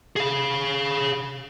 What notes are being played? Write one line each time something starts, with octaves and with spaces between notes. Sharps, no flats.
G#4 F5